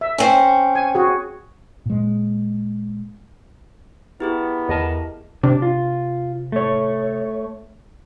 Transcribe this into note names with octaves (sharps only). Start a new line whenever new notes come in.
E5
C4 C#4
G#5
F#4 G#4
A#2 G#3
B3 E4 G4 G#4
E2 A#4 D#5 A5
C3 D4
F4
A3 C#5